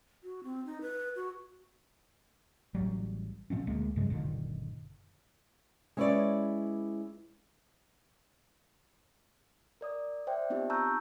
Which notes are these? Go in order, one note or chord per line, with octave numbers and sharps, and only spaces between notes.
F#4
C4
D#4
B4
F#4
A1 F#3 G3
A#2 F3 C4 C#4
D2 G#3 A#3
G2 C#3 F#3 G#3
F#1 A#2 D3 D#3
G#3 C#4 E4 B4 C#5 D5
A#4 D5 D#6
C5 D5 E5 G5
B3 C4 D#4 F4 G4
A5 A#5 C#6 E6 F#6 G6